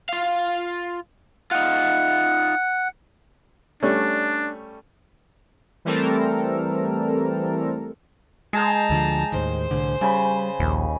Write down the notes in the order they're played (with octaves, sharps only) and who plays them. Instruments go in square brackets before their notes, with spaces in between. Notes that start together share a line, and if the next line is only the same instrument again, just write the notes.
[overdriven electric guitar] F4 F5
[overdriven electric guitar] D#4 F4 [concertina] F#5
[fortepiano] G3 A3 C#4 [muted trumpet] D4
[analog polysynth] E3 G3 A3 C4 A4 A#4
[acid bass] G#3 [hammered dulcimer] G#4 G5 [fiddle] A5 A#5
[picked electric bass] D2 D3 F3
[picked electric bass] D#2 A2 D#3 [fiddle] C5
[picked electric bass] C2 A2 D3
[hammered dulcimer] C#3 G#5 B5 [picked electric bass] G3
[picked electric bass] A#1 [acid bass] D#2